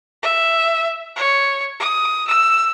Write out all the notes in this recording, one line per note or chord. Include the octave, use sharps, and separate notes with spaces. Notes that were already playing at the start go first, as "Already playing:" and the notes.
E5
C#5
D#6
E6